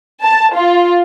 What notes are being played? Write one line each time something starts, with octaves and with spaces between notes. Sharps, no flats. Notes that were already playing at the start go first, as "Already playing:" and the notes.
A5
F4